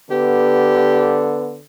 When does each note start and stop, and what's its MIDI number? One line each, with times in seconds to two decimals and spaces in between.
0.11 1.65 50
0.11 1.56 59
0.11 1.34 67